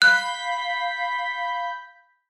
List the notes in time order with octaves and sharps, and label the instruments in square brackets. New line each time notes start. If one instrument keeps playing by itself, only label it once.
[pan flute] F5 [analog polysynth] B5 G6 B6 [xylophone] F#6